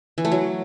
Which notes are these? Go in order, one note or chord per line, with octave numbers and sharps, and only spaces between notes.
E3
A3
F#3